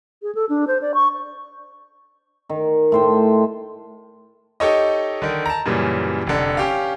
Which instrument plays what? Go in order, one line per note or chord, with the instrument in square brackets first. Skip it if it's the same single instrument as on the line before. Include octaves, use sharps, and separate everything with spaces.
[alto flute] G#4
A4
D4
C5
D5
C#6
[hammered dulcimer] D#3
A2 C5 G5
[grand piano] D#4 G4 A4 C#5 D#5
D3 D#3
A5 A#5
F#2 A#2 C#3 E3 G3
F1 D3
C#4 G4 F5